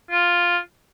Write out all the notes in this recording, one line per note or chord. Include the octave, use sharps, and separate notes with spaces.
F4